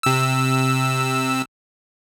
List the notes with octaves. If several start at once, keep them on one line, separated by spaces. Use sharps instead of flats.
C3 E6